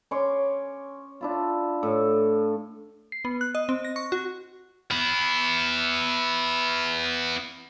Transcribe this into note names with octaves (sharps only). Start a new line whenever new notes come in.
C#4 C#5 C6 D6
D4 E4 F4
A2
C7
B3
F#6
D#5
C4
A#6
C#6
F#4
B3 E4